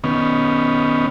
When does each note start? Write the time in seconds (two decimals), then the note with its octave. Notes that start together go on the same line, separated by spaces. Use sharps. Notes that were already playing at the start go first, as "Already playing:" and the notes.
0.04 D#3 B3 C#4